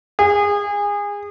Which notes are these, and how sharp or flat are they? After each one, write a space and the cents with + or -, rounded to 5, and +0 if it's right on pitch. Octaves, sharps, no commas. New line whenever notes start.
G#4 -25